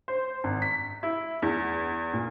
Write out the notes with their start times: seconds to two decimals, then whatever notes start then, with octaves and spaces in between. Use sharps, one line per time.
0.08 C5
0.44 G#1
0.62 B6
1.03 E4
1.42 E2
2.13 A#2